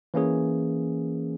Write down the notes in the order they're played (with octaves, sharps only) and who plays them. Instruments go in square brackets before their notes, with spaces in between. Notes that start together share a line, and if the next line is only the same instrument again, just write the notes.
[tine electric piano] E3 A#3 C#4 G#4